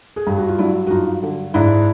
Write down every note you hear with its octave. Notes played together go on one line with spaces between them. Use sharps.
G#4
G2 G4
F#4
F4
F#3 D4 E4
F#4
G2 D#4 F4
D3
G#2 D4 E4